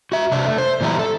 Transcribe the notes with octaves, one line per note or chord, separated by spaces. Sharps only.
F#4 E5
C3 D4 E5
A3
C5
A#2 E3 G3 D4 E5 A#5
A4